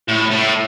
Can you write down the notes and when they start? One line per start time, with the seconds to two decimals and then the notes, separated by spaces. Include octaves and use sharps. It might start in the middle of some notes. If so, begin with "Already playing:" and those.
0.08 A2
0.31 A2